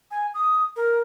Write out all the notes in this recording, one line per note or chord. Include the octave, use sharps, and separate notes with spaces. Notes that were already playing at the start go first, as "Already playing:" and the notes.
G#5
D#6
A#4